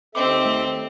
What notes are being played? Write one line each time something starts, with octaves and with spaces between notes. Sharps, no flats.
D#2 C4 A4 D#5 E5 D6
A3